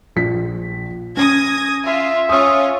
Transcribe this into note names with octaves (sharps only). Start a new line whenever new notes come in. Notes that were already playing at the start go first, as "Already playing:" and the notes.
A#1 F3 B6
C#4 D#6 G#6 A#6
F4 E5
C#4 F4 D#6 E6